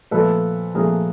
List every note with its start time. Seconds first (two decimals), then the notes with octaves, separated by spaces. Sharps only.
0.11 A#2 F3 A3 A4 B4
0.75 A#2 F3 A3 G#4 A#4